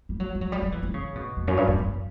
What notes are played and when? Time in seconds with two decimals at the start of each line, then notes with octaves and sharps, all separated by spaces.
0.09 G3
0.20 F#3
0.35 G3
0.41 F#3
0.52 G3
0.62 F#3
0.72 E3
0.83 E3
0.94 C#3
1.15 B2
1.37 E2
1.48 F#2
1.57 G2
1.68 F#2
1.79 F#2